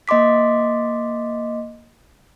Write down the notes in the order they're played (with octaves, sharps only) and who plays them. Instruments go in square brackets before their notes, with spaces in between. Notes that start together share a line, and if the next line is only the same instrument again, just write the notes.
[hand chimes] A#3 D#5 C6 D6 B6